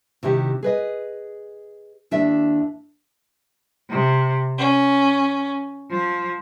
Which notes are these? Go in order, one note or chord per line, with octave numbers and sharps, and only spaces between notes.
C3 D#3 E4 F#4 G4
G#4 B4 D#5
D#2 D4 E4 E5
C3
C#4
F3